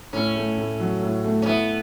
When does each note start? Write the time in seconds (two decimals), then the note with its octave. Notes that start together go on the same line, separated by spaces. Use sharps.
0.13 A2 C#4
0.35 A3
0.57 A2
0.80 F#3
1.02 A2
1.24 A3
1.42 C#4
1.46 B3 E4